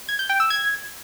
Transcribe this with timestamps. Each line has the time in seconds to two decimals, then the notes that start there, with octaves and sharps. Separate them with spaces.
0.09 G#6
0.19 G6
0.29 G5
0.40 E6
0.50 G#6